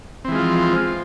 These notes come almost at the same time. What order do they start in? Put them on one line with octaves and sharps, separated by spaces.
C4 E3 G#3 F4 F3